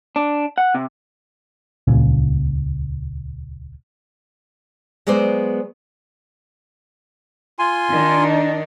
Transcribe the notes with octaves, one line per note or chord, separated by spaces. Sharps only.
D4
F#5
C3
D#1 C#2 A#2 C#4
F#3 G#3 B3 C5 D5
F4 G#5 C6
D#3 D4 D#4